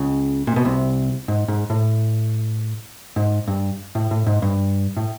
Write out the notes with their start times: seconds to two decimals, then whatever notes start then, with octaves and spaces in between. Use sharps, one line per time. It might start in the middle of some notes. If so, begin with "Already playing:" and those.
Already playing: C#2 C#3
0.47 A#2
0.56 B2
0.65 C2 C3
1.28 G#2
1.48 G#2
1.70 A2
3.16 G#2
3.48 G2
3.95 A2
4.11 A2
4.27 G#2
4.42 G2
4.97 A2